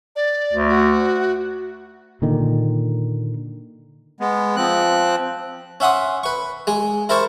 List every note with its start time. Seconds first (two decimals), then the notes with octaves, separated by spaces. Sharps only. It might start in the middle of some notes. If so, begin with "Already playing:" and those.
0.16 D5
0.53 D2
0.69 F#4
2.22 A#2 D3 D#3
4.20 G#3 B3
4.56 F3 C4 F#6
5.80 C#4 E5 F#5 C6 D#6
6.23 B4 C#6
6.67 G#3 G#4
7.09 E4 A#4 C5 A5 C#6